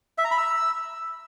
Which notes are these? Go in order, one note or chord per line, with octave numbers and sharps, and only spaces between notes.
E5
A#5
B5
E6